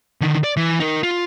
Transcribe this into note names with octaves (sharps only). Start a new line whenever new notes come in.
D3 D#3
D5
E3
D#4 A#4
F4